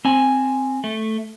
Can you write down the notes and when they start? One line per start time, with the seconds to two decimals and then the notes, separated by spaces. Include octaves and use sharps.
0.05 C4 G#5
0.84 A3